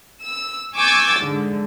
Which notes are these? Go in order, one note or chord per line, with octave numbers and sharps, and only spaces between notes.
E6
G#5 C#6 D6 E6 G6 A6
G#2 D3